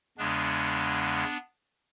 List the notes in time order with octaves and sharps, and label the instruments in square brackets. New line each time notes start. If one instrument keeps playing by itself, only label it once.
[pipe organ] E2 C#3 G#3 B3 D4